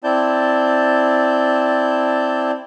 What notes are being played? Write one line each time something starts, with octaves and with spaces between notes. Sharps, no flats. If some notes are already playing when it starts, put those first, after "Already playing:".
C4 E4 D5 A5 G6